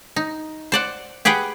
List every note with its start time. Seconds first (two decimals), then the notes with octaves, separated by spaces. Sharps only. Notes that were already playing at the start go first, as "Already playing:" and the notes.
0.16 D#4
0.72 C5 D5 F#5
1.25 G4 G#4 B4 F#5 G5